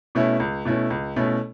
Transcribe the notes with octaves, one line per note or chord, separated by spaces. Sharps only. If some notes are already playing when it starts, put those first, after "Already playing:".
B2 A3 C#4 E4
C#2
B2 A3 C#4 E4
C#2
B2 A3 C#4 E4